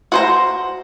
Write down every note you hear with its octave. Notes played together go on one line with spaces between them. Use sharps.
F#4 C5 A#5